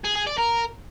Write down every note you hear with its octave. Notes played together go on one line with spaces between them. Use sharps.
G#4
G#4
D5
A#4